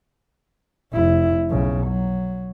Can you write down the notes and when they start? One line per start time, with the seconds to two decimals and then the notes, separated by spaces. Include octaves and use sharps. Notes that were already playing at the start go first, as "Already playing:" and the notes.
0.93 F1 E4
1.50 B1 C#3
1.87 F#3